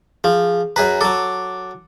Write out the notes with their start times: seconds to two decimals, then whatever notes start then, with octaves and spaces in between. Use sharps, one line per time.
0.24 F3 G#4
0.76 F#2 G#4 B4 A#5
1.01 F#3 A4 D6